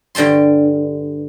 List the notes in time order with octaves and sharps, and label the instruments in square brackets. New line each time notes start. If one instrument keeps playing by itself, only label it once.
[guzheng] G2 D3 G5 A5 C6